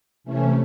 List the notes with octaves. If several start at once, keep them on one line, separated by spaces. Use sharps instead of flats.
C3 E3 A3 C#4